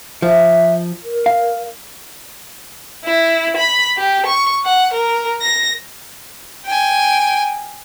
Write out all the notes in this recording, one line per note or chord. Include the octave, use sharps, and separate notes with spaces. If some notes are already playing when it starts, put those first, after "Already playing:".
F3 E5
A#4
F5
E4
B5
G4
C#6
F#5
A#4
A#6
G5 G#5